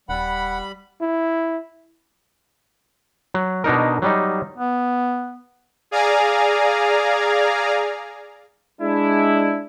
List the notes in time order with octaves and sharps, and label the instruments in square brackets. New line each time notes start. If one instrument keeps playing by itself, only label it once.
[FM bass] D#1 [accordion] G3 B5 [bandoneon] F#5
[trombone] E4
[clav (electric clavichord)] F#3
B2 D4 D#4 A#4
F#3 G3 D#4
[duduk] B3
[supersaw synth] G#4 D5 F5 G#5 A#5
[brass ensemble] G#3 D4 E4